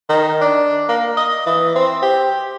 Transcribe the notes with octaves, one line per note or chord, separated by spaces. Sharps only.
D#3
D4
A#3
D#5
E3
C4
G4